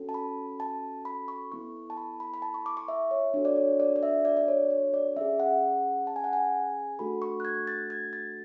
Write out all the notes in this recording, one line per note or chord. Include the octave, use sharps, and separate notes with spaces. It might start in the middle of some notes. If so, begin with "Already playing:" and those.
Already playing: C#4 F#4 A4
A5
B5
A5
B5
C#6
B3 E4 A4 C#6
A5
B5
B5
B5
A5
C#6
D6
C#6
E5
C#5
D4 F#4 A4 C#5
D5
C#5
D5
D5
E5
D5
D5
C#5
C#5
D5
C#4 G#4 E5
F#5
A5
G#5
F#5
G#5
A3 D4 F#4 A4 B5
C#6
F#6
G#6
A6
G#6
A6